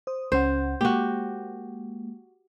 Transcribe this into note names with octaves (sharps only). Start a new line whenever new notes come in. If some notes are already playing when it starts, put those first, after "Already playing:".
C5 D#6
C#2 C#4 C5 F#5
G#3 A#3 F#4 G4